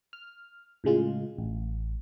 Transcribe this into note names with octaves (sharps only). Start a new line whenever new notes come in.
F6
A2 C#3 G#3 F4
A1